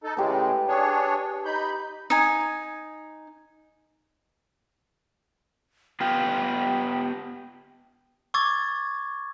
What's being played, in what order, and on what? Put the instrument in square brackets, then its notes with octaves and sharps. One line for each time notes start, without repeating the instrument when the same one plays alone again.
[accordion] D#4 A4
[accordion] A2 C#3 G#3 [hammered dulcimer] G4 B4
[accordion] D4 G#4 C#5
D#4 B5 G6
[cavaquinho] D#4 G#5
[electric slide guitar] B3 F4 G4 [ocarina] G5
[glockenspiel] C#6 D6 E6 G#6 A6